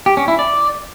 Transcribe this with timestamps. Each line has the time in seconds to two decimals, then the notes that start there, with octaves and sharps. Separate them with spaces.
0.06 G4
0.17 C#4
0.28 E4
0.39 D5